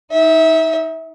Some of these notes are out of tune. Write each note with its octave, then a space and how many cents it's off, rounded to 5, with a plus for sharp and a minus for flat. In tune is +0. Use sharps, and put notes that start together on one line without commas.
D#4 +25 E5 -20